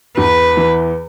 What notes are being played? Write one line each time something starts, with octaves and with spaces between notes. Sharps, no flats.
E2 B4
E3